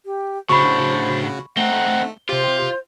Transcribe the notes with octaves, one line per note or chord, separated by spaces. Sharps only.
G4
A2 C#3 D4 F#4 C5 B5 C#6
A3 C4 D#4 F#5 G7
C3 F4 G4 C5